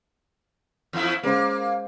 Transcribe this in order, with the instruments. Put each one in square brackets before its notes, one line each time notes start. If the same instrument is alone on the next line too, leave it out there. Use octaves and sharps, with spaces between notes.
[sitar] E2 F3 E4
[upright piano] G#3 C#4 C5 [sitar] A#3